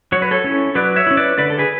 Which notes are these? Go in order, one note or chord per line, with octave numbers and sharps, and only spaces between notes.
F#3 C#5
B4
A4 C#5
C#4 E4
F#3 B4 D5
C#5 E5
C#4 E4
B4 D5
D3 B4 D5
A4
G#4 B4